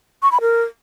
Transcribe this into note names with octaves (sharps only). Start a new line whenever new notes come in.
C#6
B5
A#4